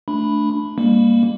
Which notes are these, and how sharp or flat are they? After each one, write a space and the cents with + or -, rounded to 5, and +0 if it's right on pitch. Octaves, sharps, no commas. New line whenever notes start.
A3 +0 D4 +0 B5 +0
G3 +35 A#3 +0